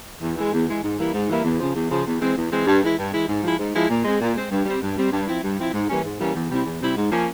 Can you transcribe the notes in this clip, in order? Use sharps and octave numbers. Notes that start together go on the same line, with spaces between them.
E2
E3 G#3
E2
E3 G#3
G#2
E3 G3 A#3 E4
G#2
E3 G3 A#3 E4
E2
C#3 F3
E2
C#3 F3
E2
E3 G#3 C4
E2
E3 G#3 C4
G2
E3 G#3 E4
G2
E3 G#3 E4
G#2
F3 G#3 E4
G#2
F3 G#3 E4
A#2
G#3 C4
A#2
G#3 C4
G2
G3 C4
G2
G3 C4
G2
F3 C4 E4
G2
F3 C4 E4
G#2
E3 G3 A#3 C#4
G#2
E3 G3 A#3 C#4
E2
C3 G3 C4 E4
E2
C3 G3 C4 E4
G#2
F3 A#3 C#4